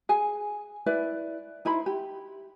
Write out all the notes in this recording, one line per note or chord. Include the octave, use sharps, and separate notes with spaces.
G#4 G#5
E4 B4 D5
D#4 E4 C5 B5
G4